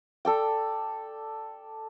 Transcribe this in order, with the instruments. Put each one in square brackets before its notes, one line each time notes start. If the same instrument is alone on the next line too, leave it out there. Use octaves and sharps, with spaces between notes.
[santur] A4 D5 G5